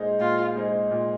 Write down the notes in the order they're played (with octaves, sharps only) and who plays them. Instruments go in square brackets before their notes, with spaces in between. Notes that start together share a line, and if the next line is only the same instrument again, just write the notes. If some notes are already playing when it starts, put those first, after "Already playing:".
Already playing: [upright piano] A#2 G#3 D#4 G#4 C5
[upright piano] A#2 [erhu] F4
[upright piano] G#3 D#4 G#4 C5
A#2